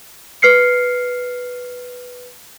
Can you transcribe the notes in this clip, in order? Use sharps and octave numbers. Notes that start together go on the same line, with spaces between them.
B4 F6 C7 C#7